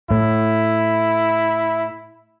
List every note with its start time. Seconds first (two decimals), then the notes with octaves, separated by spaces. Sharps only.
0.11 A2 E4